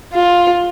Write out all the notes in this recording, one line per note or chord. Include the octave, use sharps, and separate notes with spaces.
F4